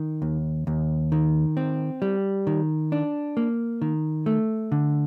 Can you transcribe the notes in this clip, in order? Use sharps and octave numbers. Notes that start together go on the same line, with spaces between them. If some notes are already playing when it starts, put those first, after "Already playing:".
Already playing: D#3
D#2
D#2
D#3
C4
G3
D#3
D4
A#3
D#3
A3
D3